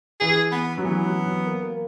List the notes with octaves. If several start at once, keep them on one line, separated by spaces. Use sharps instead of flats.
E3 G#4
B3
F#3
E3 B3
F#3
F#3
A#3
A#3